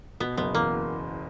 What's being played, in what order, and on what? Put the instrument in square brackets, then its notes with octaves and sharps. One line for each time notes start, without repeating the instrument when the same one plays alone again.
[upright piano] B2 [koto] B3
[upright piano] F#1 [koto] B3
[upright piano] E2 [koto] A#3